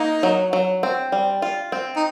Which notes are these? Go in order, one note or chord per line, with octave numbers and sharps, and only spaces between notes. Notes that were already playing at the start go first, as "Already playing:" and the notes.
Already playing: A#3 D#4
F#3
F#3
C4
G3
F4
C4
D#4